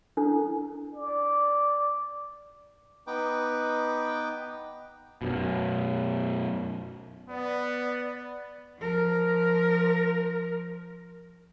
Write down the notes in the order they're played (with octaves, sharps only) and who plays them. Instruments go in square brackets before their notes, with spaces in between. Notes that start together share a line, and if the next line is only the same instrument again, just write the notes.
[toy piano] D4 E4 A4
[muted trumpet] D5
[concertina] B3 D#4 B4 G5 D6
[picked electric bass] F#2 B2
[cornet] B3 [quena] D5
[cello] F3 A#4